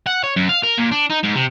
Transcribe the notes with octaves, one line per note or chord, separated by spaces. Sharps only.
F#5
C#5
F#2
F5
A#4
A#2
D4
D#4
G#2
C3